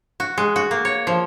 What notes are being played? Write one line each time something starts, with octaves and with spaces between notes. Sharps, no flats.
F#4
G#3
F#4
A#3
C#5
F3